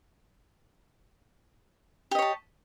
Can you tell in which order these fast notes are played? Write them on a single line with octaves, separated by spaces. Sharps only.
G4 D#5 C#5 A5